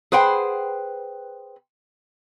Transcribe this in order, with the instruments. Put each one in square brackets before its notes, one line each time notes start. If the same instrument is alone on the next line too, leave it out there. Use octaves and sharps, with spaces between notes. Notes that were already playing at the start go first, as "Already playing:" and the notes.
[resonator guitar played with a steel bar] G#4 B4 C5 F#5 G5